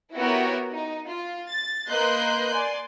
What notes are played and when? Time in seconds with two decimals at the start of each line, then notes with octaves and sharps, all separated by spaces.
0.13 B3 E4 F#4 G4 A#4 C#5
0.72 D#4
1.06 F4
1.47 A6
1.88 A#3 B4 D#5 C6 F#6 G6
2.51 D5 G#5 C6